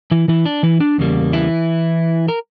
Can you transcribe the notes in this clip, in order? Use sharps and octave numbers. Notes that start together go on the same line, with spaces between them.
E3 E4
E3 E4
D4
E3 E4
D4
E2 C#3 G3 A#3
E3 E4
A#4